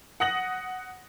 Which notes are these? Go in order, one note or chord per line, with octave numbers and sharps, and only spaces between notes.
F#5 D#6 A#6 F#7